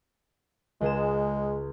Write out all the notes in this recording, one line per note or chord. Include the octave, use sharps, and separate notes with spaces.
C#2 G#3 G#4 E7